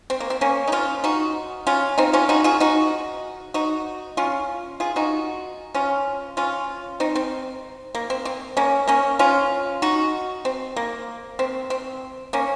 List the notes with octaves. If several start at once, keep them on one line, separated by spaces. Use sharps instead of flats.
C4
A#3
C4
A#3 C#4
D#4
C#4 F4
D#4 F#4
C#4 F4
C4 D#4
C#4 F4
D#4 F#4
F4 G#4
D#4 F#4
D#4 F#4
C#4 F4
F4 G#4
D#4 F#4
C#4 F4
C#4 F4
C4 D#4
C4
A#3
C4
C4
A#3 C#4
A#3 C#4
C#4 F4
D#4 F#4
C4
A#3
C4
C4
A#3 C#4